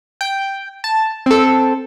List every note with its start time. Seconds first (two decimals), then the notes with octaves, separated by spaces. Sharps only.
0.21 G5
0.84 A5
1.26 C4 A4